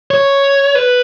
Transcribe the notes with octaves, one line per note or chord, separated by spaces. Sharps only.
C#5
B4